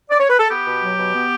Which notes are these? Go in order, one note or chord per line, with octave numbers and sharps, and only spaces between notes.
D5
C#5
B4
A4
B3 G4
B2
F#3
B2
B3